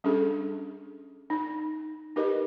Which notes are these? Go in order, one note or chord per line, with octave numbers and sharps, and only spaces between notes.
G3 C#4 D4 G#4 A4
D#4
D#4 G4 A#4 B4 D#5